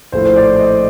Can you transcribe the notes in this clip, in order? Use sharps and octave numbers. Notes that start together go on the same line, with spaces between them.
A#1 A2 A3 C5
C5
D5
D#5